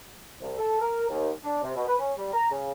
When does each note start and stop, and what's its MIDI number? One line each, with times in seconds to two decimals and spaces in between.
0.41 0.54 36
0.58 0.78 69
0.81 1.06 70
1.09 1.30 39
1.43 1.62 62
1.63 1.71 48
1.75 1.83 47
1.87 1.95 71
1.99 2.12 61
2.17 2.30 55
2.33 2.51 82
2.51 2.72 49